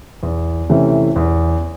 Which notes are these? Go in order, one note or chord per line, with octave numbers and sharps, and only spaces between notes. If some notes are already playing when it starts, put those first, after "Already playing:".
E2
C3 E3 A3 C#4
E2